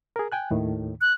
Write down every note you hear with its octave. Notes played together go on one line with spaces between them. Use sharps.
G#4 A#4
G5 G#5 F#6
D#2 A2 D#3
F#6